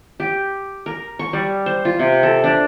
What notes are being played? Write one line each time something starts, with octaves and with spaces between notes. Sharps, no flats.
G4
A#4
C#6
G3
C5
F4
C3
A4
D4